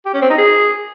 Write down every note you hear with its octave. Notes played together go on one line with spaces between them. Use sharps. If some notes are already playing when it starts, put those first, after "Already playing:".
G4
C#4
C4
D#4
G#4